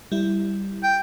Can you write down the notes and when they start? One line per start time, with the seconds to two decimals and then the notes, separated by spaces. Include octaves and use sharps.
0.12 G3 E4
0.83 G5